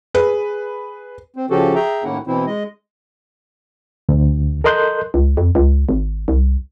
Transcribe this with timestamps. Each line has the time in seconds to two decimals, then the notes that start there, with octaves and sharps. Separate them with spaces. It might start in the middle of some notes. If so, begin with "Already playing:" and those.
0.14 G#4 B4
1.36 C4
1.50 C#3 F3 C#4 F#4 G4 A4
1.75 G#4 E5 G5 A#5
2.04 A2 D#3 A#3 C#4 E4 F#5
2.27 B2 E3 C4 E4
2.46 G#3 D#5
4.09 D2
4.64 A4 A#4 D#5 C6 F#6 G6
5.14 C#2
5.37 F2
5.55 C#2
5.89 G#1
6.28 C2